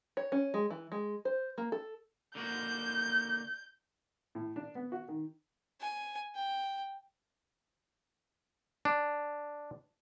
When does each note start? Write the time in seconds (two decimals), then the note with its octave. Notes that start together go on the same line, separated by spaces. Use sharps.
0.17 C#5
0.32 C#4
0.54 G#3
0.71 E3
0.92 G#3
1.25 C5
1.58 A#3
1.72 A4
2.35 D3 A#3 F#4 G6
4.35 A2
4.56 D4
4.75 B3
4.92 F#4
5.08 D#3
5.80 G#5
6.35 G5
8.85 D4